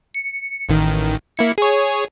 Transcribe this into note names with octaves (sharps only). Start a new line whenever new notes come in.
C#7
A1 D#3
A#3 E4 C#7
G#4 C#5